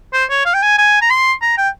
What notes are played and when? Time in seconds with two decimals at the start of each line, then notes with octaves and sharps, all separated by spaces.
0.13 C5
0.30 C#5
0.45 F5
0.54 G5
0.62 G#5
0.78 G#5
1.01 A#5
1.10 C6
1.42 A#5
1.58 G5